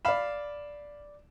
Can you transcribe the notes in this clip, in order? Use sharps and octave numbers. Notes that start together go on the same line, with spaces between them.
D5 F5 B5 E7